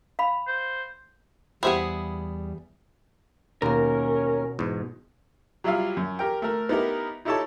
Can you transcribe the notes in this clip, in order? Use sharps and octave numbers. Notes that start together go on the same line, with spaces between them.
F5 B5
C5
E2 G3 B3 E4 G4 G#4 C5 B5
D#2 B2 A#3 C#4 A#4
E2 G#2
F#3 G3 E4 F4 E5 F5
F#2
G4 A#4 G5
A3 A#4
B3 D#4 E4 G4 A#4
D#4 E4 G4 A4 C#5 A5